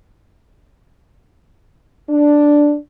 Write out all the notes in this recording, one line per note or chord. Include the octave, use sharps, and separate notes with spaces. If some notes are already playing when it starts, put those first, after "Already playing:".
D4